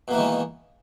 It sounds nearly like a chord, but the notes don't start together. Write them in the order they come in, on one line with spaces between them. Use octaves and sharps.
B2 A#3 E3 D#3 G#3